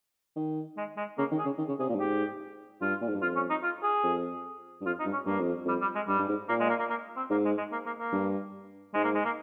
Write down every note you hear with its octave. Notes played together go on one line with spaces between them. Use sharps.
D#3
G#3
G#3
C#3 A#3
D#3
G#4
C#3
D#3
C#3
C3 G#4
A#2
G2
G#2 G4
G2 F4
A#2
G#2
G2
F2 F4
C#4
D#4
F4
G#4
F2
G2
F2 F4
D#4
G2
C#4
G2 A#3
F2
F2 G3
G3
G#3
G2 G3
G2
G#2
A#2 A#3
G#3
A#3
A#3
A#3
C4
G#2 A#3
G#3
G#3
A#3
A#3
A#3
G2
G#2 G#3
A#3
G#3
A#3